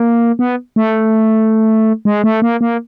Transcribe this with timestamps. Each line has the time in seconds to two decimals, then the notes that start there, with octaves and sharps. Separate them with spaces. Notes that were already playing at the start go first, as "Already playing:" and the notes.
Already playing: A#3
0.39 B3
0.76 A3
2.05 G#3
2.24 A3
2.42 A#3
2.61 A#3